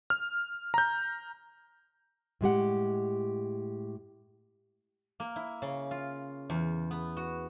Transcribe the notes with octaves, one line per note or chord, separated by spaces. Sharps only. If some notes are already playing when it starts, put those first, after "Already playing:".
F6
A#5 G6
A2 G#3 G4 F#5
A#3
E4
C#3
F4
E2
B3
F#4